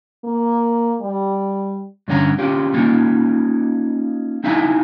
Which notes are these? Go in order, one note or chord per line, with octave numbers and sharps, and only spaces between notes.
A#3
G3
G2 D3 C#4 F#4 A#5
C4 C#4 F4 G4
A#3 C#4 D#4 F4
C4 D#4 E4 E5 F5 G#5